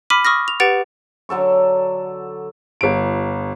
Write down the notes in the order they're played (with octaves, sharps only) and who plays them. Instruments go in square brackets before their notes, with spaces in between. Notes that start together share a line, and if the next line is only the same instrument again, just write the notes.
[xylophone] B5 D6 F6 B6 D#7
C#6 D#6 F6 A#6
F7
G4 B4 F#5 A6 D7 F7
[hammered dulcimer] D3 F#3 A4 C#6
[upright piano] G1 D7